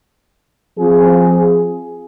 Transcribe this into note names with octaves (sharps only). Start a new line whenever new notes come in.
F3 C4 F4 G#4